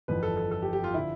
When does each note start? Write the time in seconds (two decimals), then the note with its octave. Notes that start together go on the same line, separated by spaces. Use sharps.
0.08 G1 F2 E3 B4
0.23 A4
0.37 A4
0.51 A4
0.62 G4
0.73 G4
0.84 F4
0.94 D3 F3 E4